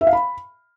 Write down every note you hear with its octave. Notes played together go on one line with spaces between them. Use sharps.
E5
F5
B5